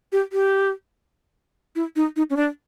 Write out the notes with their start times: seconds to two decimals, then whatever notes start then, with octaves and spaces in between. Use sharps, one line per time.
0.12 G4
0.33 G4
1.75 E4
1.96 D#4
2.16 D#4
2.30 C#4
2.37 D4